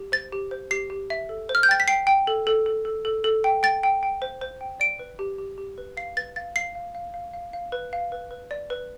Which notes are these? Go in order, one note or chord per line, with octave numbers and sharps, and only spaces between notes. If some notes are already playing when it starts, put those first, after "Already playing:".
Already playing: G4
C5 A6
G4
C5
G4 C7
G4
E5
A4
C5
F6
G6
G5 A6
B6
G5 C7
G5
A4
A4
A4
A4
A4
A4
G5
G5 A6
G5
G5
C5
C5
G5
D5 D7
B4
G4
G4
G4
B4
F5 C7
B4 A6
F5 A6
F5 C7
F5
F5
F5
F5
F5
B4
F5
B4
B4
D5
B4